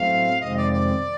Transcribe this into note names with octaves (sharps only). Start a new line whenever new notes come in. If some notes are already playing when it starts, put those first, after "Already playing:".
Already playing: A2 F#3 A3 C4 F5
F2 C3 D#3 G#3 C4 D#5
D5
D5